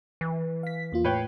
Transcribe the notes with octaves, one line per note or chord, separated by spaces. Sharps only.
E3
F5 B6
E2 A#3 F4
A2 B4 C#5 G5 C7